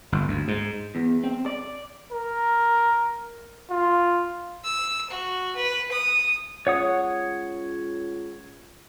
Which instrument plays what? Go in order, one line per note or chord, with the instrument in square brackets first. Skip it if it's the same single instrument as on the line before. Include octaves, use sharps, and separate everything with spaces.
[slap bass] G1
D2
G#2
[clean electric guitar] E2
C4
D5
[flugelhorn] A#4
F4
[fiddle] E6
F#4
B4
D#6
[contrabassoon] C#2 [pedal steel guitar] C#5 F#5 D#6